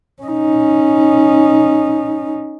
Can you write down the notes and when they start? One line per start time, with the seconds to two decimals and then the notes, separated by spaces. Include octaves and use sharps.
0.22 C#4 D#4